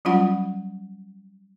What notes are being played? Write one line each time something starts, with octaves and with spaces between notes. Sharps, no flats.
F#3 G3 C#4 F4 F#5 B5